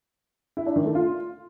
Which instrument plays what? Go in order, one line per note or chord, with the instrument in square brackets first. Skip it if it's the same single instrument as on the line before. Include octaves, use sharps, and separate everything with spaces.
[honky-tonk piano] E4
D4
D#3
A3
F4